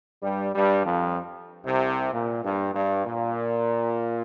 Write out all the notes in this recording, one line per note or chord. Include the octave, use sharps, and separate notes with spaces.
G2 G3
G2 G3
F2 F3
C2 C3
A#2
G2
G2
A#2